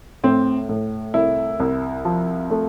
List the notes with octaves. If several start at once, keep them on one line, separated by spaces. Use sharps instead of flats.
A2 C4
A2
C2 E4
C2
F3
A3